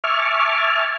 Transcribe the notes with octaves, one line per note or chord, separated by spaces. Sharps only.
E5 G#5 A5 C#6 D6 F6